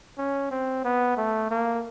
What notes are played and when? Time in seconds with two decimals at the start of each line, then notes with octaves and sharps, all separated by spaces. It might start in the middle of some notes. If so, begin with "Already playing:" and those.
0.18 C#4
0.51 C4
0.84 B3
1.17 A3
1.51 A#3